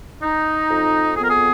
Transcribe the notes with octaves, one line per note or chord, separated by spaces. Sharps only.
D#4
F2
B3 G#4
A#4
G#4